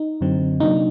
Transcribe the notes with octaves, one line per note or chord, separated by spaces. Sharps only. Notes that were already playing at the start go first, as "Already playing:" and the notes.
Already playing: D#4
F#2 D3 F#3 C4
C3 F#3 A#3 D4 D#4